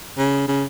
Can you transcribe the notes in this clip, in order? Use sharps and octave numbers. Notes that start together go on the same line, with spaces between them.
C#3
C#3